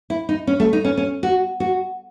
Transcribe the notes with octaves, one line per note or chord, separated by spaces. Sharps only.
E4
D#4
C#4
A3
D#4
C#4
C#4
F#4
F#4